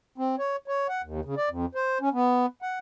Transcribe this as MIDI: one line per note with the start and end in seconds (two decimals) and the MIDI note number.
0.18 0.36 60
0.39 0.56 73
0.68 0.87 73
0.89 1.02 78
1.03 1.20 39
1.25 1.35 49
1.38 1.49 74
1.50 1.66 41
1.75 1.98 72
2.01 2.09 61
2.13 2.46 59
2.62 2.79 78